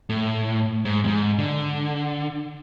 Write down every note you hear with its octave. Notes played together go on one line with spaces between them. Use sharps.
A2
G#2
E2 G#2
D3